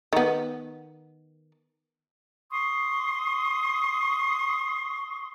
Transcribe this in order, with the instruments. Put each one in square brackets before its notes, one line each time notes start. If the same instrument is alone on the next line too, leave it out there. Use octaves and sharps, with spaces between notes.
[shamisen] D#3 B3
[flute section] C6 C#6 D#6